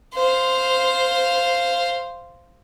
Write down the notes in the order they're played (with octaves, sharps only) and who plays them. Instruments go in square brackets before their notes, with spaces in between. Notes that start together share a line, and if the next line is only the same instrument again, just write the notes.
[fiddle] C5 F5